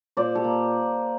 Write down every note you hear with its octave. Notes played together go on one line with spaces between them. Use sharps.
A#2 C5 D5
G4 A4
A#3